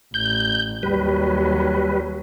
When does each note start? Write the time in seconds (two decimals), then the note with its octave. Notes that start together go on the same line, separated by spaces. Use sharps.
0.14 A1 G6
0.83 D#2 F#3 G3 B4